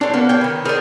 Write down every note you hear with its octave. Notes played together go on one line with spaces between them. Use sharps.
A2 D4 C5 C#5
A#3 B3
C#5 G5
D#3 B4
D4 G#4 A#4 C5